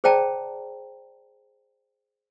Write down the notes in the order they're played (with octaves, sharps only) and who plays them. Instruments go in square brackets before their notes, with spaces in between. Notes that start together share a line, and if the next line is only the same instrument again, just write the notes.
[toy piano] G#4 C5 D5 G5 A5 A#5